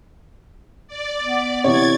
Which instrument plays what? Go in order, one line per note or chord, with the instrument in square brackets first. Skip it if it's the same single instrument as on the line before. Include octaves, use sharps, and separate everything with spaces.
[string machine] D5
[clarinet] B3
[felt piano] C3 E3 [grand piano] C#5 [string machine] G#6 A6